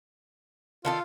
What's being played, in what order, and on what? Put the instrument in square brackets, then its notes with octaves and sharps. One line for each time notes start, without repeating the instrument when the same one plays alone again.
[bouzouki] D#3 A4 F5 [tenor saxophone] F4